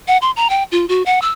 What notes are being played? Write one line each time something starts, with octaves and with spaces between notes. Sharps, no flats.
F#5
C6
A#5
G5
F4
F#4
F#5
E6